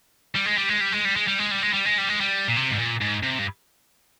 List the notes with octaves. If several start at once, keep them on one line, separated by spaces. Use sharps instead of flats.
G3
G#3
G3
G#3
G3
G#3
G3
G#3
G3
G#3
G3
G#3
G3
G#3
G3
G#3
G3
A#2
C3
G#2
A#2
G#2
C3
G2